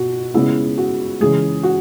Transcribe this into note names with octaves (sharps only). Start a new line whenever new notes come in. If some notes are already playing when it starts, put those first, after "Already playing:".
Already playing: B2 F#4
C#3 G#3 B3 E4
F#4
C#3 E3 G#3 G#4
F#4